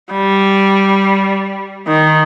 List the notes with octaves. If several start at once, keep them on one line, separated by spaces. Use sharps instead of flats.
G3
D#3